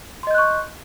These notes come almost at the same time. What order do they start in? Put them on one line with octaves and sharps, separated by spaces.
C6 D#5 G6 F#6 C#6